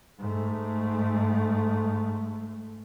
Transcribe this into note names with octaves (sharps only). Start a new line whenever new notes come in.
G#2 A3